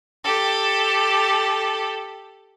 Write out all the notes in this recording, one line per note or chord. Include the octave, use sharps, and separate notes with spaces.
G4 A4